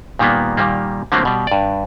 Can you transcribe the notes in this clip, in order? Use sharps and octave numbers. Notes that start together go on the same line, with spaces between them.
A#2 D#3 G3 A#3 B3
A#2 D#3 G3 A#3
D3 F3 F#3 A3 A#3 C4
B2 G3
G2 D5